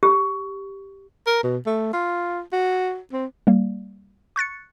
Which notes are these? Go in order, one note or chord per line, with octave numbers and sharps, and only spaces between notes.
G4
A#4
B2
A3
F4
F#4
C4
G3 A#3
C#6 F#6 A6 C#7